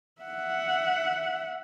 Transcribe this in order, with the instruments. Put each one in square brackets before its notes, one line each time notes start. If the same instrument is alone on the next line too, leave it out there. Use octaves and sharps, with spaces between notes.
[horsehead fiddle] E5 F#5